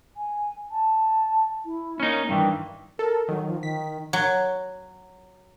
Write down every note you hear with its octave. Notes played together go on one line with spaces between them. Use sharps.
G#5
A5
E4
A#3 C#4 D#4
G2 D#3 E3 G5
A4 A#4
D#3 F#3
F3
D#3 B6
F#3